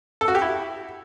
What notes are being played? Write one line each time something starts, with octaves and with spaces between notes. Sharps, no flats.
A4
F#4
G4
E4